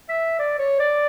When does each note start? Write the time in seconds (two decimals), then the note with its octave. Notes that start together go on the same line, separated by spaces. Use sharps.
0.09 E5
0.39 D5
0.59 C#5
0.80 D5